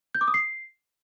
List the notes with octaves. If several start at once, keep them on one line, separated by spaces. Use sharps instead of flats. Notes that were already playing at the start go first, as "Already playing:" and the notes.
G6
D6
D#6
C7